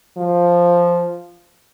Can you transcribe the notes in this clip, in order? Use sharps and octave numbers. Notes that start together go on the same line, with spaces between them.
F3